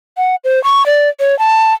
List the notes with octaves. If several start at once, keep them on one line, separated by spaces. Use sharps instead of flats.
F#5
C5
C#6
D5
C#5
A5